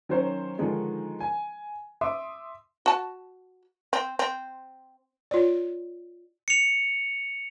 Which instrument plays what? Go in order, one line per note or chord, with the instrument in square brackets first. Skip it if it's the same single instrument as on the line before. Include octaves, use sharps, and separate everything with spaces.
[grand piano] D#3 F#3 C#4 C5
D3 D#3 F3 G#3 D#4
G#5
E5 C6 D6 D#6
[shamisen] F#4 A5
C4
C4
[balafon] F4 C#5 D5
[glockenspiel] C#7 F7